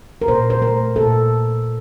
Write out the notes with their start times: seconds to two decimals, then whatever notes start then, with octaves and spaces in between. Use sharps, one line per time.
0.22 A#4
0.28 A#2 C5
0.50 C5
0.61 A3 A#4
0.95 A#2 A4